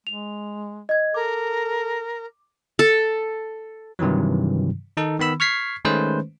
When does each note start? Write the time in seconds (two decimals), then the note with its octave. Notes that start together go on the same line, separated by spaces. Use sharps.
0.07 G#3 F7
0.89 D#5 G#6
1.14 A4 A#4 D6
2.79 A4
3.99 G2 C3 D#3 E3 F#3
4.97 D#3 D#4 A4
5.19 D#3 B3 B5 E6
5.40 C#6 F6 G#6 B6 C7
5.85 D#3 G#3 A3 C#4 B4 C5